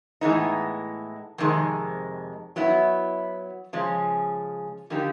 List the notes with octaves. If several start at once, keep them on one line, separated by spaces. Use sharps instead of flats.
A2 E3 G#3 B3 D#4
F2 C3 D#3 G#3
F#3 B3 E4
C#3 F3 G#3 C#4
D3 F3 A#3 D#4 G4